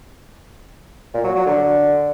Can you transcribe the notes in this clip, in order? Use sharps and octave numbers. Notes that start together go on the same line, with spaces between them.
A#2
F#3
F#3
D3